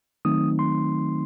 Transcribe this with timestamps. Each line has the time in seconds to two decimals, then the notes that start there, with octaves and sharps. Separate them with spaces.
0.25 D#3 F#3 A3 C4 D#4 D#6
0.59 C6